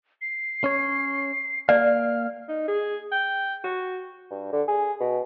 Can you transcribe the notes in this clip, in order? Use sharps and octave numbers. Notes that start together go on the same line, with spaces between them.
C7
C#4 C#5
A#3 D5 F5 F6
D#4
G#4
G5
F#4
G2
D3
G#4
B2